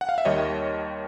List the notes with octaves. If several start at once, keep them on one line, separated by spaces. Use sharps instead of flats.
F#5
F5
E5
D#2 D#3 G3 C#5 D#5